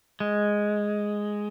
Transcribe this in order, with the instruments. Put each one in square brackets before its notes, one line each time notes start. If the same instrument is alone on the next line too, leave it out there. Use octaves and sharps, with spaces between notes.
[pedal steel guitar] G#3